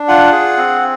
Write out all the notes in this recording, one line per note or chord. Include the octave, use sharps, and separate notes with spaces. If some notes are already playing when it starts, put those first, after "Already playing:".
Already playing: D4
F4 F#5
G#4
C4